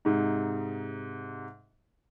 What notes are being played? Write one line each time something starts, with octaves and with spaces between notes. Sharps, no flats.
G#2 C3 D#4